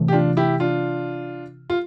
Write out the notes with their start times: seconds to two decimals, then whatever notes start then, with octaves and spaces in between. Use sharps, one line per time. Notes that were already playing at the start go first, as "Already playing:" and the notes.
Already playing: C3 E3 A3
0.08 G4
0.13 D4 F4
0.37 E4 G4
0.60 D4 F4
1.70 F4